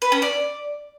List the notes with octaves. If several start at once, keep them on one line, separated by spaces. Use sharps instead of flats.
B4
C#4
D5